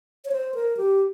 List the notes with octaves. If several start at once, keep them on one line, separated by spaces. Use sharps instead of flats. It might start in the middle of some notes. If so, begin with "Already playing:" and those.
C#5
C5
A#4
G4